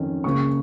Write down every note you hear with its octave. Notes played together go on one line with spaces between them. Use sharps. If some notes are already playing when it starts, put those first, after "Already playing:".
Already playing: F2 D#3 C#4
C#2 C#3 A#3 C#4 C#6